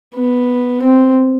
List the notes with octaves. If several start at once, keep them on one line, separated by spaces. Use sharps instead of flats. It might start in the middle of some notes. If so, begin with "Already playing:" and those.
B3
C4